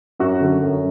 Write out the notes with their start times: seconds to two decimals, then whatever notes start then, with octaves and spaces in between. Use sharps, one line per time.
0.19 F#2 F#4
0.41 D3
0.63 F#2